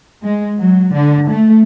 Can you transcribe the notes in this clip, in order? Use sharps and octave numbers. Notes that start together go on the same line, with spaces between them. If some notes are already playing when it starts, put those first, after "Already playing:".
G#3
F#3
D3
A3